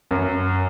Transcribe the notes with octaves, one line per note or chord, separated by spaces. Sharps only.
F#2